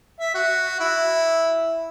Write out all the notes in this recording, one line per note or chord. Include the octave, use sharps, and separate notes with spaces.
E5
F#4
E4